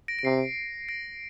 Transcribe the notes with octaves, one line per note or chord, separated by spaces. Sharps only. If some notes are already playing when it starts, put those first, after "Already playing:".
A#6 D7
D7
C3 C7
A#6 D7